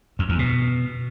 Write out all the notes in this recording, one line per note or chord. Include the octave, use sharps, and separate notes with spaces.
F2
E2
B2